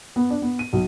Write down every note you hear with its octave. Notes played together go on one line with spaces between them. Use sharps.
B3
D4
B3
D#7
B1